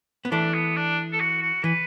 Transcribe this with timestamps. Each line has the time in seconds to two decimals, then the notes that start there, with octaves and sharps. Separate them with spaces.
0.25 B3
0.31 E3 A3 D4
0.54 B3
0.76 D4
1.13 A4
1.20 F#4
1.42 F#4
1.64 E3 B4